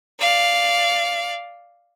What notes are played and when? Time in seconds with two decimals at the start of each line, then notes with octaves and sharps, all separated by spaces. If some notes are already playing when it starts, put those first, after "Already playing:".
0.20 D5 F5